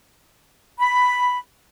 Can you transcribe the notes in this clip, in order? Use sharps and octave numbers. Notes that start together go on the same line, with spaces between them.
B5